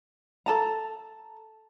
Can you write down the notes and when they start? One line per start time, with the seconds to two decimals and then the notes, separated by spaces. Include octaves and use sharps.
0.46 A4 A5 A#5